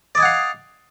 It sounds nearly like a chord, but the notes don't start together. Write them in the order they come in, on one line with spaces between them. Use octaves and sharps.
D5 D#5 G#5 F#5 F5